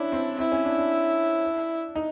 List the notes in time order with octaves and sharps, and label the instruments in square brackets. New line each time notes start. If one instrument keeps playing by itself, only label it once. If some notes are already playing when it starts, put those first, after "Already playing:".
Already playing: [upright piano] C#4 D4 [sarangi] E4
[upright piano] C4
[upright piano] C4 [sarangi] E4
[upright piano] C#4
D4
D4
D#4